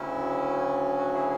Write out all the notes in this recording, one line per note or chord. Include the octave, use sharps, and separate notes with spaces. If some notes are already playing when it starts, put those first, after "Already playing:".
Already playing: D2 C#3 F#3 C#4 E4
F#4
E4 G#4